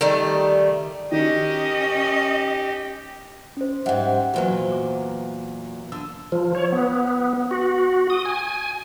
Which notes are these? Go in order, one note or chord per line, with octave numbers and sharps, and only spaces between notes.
D#3 G3 A3
D#3 C#4 G4 D#5
C#4 C5
G#2 G3 E5 F#5 G5
E2 A#2 F#3 F#4 B4 C5
D6
D3 E6
F3
C#5
B3
F#4
D#6
G#5